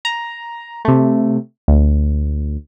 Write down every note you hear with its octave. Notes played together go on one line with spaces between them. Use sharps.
A#5
C3 A3
D2